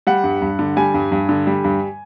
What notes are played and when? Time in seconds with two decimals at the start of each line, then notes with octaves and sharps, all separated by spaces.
0.07 G3 F#5
0.24 G2
0.42 G2
0.59 D3
0.77 G3 G#5
0.94 G2
1.12 G2
1.29 D3
1.47 G3
1.64 G2